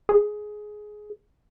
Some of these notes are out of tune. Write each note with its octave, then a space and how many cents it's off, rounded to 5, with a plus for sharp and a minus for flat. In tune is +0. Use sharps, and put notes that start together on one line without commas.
G#4 +15